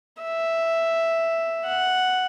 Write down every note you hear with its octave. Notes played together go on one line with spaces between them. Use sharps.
E5
F#5